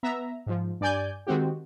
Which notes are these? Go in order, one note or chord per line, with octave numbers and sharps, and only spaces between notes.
B3 E5 A#5
G#2 F3
G2 D5 G#5 G6
D#3 G#3 C4 F#4 G4